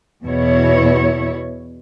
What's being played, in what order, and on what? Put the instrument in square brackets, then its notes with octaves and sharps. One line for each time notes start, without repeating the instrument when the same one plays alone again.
[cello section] E2 B2 E4 C#5